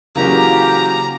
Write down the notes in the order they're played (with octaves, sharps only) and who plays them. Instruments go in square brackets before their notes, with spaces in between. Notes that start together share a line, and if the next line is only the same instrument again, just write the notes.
[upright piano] C#3 E3 F#3 [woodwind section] A#3 G4 [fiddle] A#5